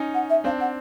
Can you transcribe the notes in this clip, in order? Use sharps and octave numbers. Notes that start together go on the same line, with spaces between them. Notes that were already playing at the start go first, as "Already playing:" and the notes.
Already playing: C#4 D#4
F#5
E5
C4 D4 F5
F#5